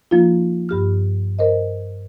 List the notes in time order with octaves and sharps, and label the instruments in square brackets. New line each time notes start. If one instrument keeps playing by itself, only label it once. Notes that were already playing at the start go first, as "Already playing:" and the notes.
[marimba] F3 A#3 D#4 F4
G2 G4 F6
A#4 C5 D#5